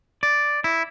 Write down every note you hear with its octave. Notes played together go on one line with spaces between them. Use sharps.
D5
E4